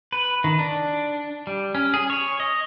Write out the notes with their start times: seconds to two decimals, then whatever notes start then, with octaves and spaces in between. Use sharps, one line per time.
0.13 B4
0.44 D#3
0.59 D4
1.47 G3
1.75 C#4
1.94 G#4
2.10 C#5
2.40 D#5